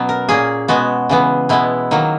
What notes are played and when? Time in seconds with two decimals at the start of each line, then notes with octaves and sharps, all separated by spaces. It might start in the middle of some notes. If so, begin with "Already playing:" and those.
Already playing: B2 F#3 B3 C#4 F#5
0.09 A#4
0.29 A#2 A#3 C#4 G#4
0.68 B2 G#3 B3 F#4
1.09 C#3 E3 B3
1.49 B2 G#3 B3 E4
1.91 D#3 F#3 A#3